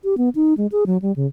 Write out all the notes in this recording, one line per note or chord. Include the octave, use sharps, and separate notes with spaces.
G4
B3
D#4
G#3
G#4
F#3
G3
C#3